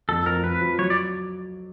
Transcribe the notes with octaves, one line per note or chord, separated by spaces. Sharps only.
F2 A4
F2 A#4
F2 B4
F3
F#3 C#5
D5